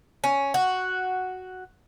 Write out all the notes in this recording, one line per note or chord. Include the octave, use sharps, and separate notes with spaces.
C#4
F#4